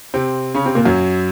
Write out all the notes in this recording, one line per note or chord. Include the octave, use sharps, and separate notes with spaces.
C3 C4
C#3 C#4
C3 C4
A#2 A#3
F#2 F#3